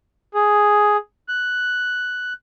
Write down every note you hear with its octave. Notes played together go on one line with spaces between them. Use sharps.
G#4
F#6